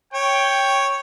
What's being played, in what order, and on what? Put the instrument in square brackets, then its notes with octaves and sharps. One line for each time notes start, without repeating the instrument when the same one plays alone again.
[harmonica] C#5 [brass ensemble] G5